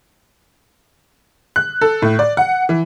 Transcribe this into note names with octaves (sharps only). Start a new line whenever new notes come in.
F#6
A4
A2
D5
F#5
E3